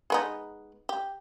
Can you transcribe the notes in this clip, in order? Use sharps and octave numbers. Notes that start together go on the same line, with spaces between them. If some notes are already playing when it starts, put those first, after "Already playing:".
G#3 B3 D#4
G4